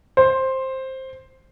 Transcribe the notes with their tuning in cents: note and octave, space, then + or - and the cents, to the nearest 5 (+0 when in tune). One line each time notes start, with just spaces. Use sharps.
C5 +10